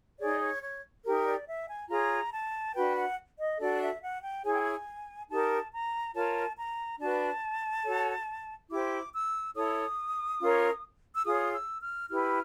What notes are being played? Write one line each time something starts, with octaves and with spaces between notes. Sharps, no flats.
D#4 G#4 C#5 D5
C#5
C#5
D#4 G4 A#4
D5
E5
G#5
F4 G#4 C#5 A#5
A5
D4 F#4 B4 G5
F#5
D#5
D4 F#4 A4 D5
E5
F#5
G5
E4 G#4 C#5 G#5
G5
G#5
D#4 G4 A#4 A5
A#5
F4 A#4 C#5 A5
A#5
D4 F#4 B4 A5
F#4 A4 C#5
E4 G4 C5 D6
E6
E4 A4 C#5 D#6
C#4 F4 A#4 C#5
E6
F4 G#4 C#5 D#6
E6
F6
E4 G4 B4 F6